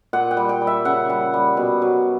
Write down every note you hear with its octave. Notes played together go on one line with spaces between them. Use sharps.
A#2 F#5
G5
G3
G5
G3
E5
C#3 F#5
G3
G3
B2
F#3